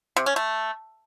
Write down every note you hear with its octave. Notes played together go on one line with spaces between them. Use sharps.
C3
C#4
A3